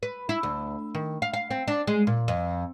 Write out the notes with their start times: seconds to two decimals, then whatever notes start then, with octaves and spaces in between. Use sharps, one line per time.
0.03 B4
0.29 E4
0.43 D2
0.95 D#3
1.22 F5
1.34 F5
1.51 C4
1.68 D4
1.87 G#3
2.07 A#2
2.28 F2